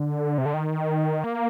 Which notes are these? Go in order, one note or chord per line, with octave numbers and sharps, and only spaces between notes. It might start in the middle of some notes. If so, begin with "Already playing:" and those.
Already playing: D3
C3
D3
D#3
A#3